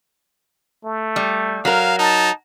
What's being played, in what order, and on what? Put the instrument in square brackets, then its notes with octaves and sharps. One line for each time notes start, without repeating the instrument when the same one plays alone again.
[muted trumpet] A3
[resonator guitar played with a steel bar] G3
[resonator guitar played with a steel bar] F#3 A#4 [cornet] F5
[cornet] D#4 [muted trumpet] A5